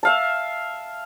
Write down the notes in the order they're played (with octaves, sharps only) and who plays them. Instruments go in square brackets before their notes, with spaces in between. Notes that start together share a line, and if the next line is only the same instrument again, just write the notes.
[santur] E5 F5 A5